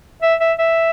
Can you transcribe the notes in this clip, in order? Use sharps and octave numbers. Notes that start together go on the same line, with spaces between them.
E5
E5
E5